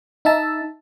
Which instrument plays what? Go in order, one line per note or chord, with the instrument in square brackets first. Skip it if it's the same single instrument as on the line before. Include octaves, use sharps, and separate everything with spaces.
[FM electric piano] D#4 E5 A5